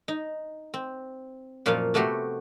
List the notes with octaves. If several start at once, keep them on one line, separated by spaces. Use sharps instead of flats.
D#4
C4
F#2 A#2 F3 A#3 C#5 F5
C3 A3 B3 F#4 G4 C6